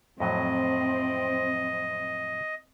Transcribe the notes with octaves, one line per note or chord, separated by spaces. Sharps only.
F2 A2 F#3 C4 D#5